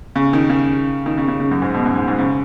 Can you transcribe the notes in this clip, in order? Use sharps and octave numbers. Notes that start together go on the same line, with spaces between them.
C#3
D#3
C#3
D#3
C#3
C#3
C#3
F#2
G#2
B2
F#2
G#2
G#2
C#3